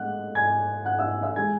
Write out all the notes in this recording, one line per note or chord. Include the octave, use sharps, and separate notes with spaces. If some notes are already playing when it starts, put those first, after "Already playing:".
Already playing: A2 E3 G#3 D#5 F#5 F#6
G#5 G#6
F#5 F#6
E5 E6
E5 E6
E3 G#3 G#5 G#6